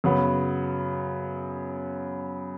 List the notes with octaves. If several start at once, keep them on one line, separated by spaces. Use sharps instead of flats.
F#2 C#3 F#3 B3